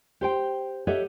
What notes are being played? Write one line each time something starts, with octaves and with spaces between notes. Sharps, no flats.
G4 C5 G5
G4 A4 C#5 D#5 E5 F#5